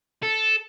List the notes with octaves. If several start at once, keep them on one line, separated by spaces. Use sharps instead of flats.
A4